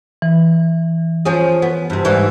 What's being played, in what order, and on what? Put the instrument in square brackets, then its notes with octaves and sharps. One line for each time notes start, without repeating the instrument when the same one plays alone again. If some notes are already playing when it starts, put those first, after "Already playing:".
[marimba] E3
[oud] F3 C#4 G#4
B3
G2 C3
G#2 E3 G3